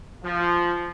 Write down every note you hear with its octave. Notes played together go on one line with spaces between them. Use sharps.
F3